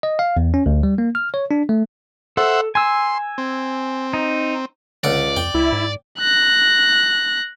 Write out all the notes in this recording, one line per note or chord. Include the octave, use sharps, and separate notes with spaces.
D#5
F5
E2
C#4
D2
G3
A#3
F6
C#5
D4
A3
A4 C5 E5 F#5
G#5 C6 E6
C4
D#4
C#2 D3 D5 F#5
F2 G5
C#2 E4
G#2
F#6 A#6